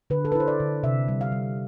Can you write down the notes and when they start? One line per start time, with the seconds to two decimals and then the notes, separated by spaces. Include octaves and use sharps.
0.10 D3 B4
0.25 A4
0.32 B4
0.35 E4 C5
0.47 D5
0.60 D3
0.83 C3 E5
1.08 G3
1.21 F5
1.32 G3